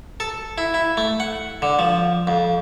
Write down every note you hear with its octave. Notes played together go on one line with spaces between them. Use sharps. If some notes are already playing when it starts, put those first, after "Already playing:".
A4
E4
E4
A3
F#5
D3
F3
F2